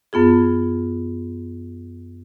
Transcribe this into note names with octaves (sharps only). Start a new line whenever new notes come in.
F#2 B3 F4 G#4